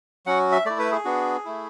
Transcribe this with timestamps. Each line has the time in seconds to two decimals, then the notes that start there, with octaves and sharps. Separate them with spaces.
0.26 F#3 C#4 F#4 F#5
0.52 E5
0.65 A3 E4 D5
0.79 B4
0.91 G#4
1.05 B3 D4 F#4
1.45 A3 E4